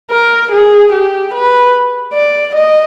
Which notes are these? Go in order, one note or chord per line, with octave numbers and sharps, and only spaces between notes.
A#4
G#4
G4
B4
D5
D#5